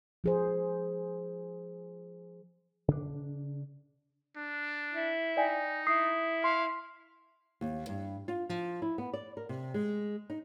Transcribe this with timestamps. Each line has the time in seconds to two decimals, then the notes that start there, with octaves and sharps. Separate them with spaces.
0.24 F3 G#4 C5
2.88 C#3 D4
4.36 D4
4.93 E4
5.37 D#4 D5 G5 G#5
5.87 E4 D#6 C7
6.44 F5 C6
7.61 D#2
7.89 G2
8.28 F4
8.49 F3
8.82 E4
8.98 B3
9.13 D5
9.37 A#4
9.49 C3
9.74 G#3
10.30 D#4